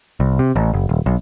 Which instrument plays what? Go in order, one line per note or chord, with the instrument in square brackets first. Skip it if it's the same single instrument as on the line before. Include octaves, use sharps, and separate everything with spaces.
[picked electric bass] C2
C3
A1
F#1
D#1
B1